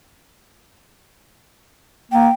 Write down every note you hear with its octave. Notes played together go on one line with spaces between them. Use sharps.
A#3 G5